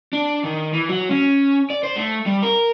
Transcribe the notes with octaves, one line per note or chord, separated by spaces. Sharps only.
D4
D#3
E3
F#3
C#4
D5
C5
A3
G3
A#4